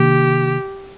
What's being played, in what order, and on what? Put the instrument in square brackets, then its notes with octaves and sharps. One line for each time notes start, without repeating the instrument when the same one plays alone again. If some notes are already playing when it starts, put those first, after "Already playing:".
Already playing: [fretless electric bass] C3 D#3 A#3 D4 [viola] G4